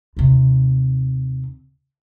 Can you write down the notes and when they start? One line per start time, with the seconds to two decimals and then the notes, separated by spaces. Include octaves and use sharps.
0.17 D#2 C3